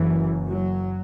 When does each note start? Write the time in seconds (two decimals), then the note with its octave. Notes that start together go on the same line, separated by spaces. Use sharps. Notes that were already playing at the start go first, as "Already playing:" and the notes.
Already playing: F#1 F#2 E3
0.48 F#3